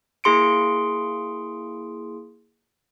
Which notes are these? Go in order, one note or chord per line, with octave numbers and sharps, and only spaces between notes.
A#3 E4 G#4 C6 C#7 D7